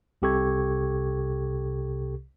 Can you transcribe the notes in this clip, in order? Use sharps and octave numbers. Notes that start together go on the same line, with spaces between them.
C2 C3 G4 A4 C#6 G#6